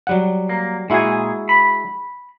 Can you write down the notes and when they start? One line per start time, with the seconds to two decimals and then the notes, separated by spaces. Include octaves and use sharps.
0.07 F#3 G3 F#5
0.49 A#3
0.90 A#2 G#3 E4 F#4 G#4
1.49 B5